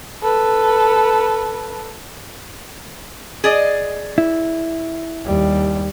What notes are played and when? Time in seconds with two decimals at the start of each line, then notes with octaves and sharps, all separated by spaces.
0.22 A4 B4
3.44 G#4 D5 D#5
4.18 E4
5.26 D#2 G3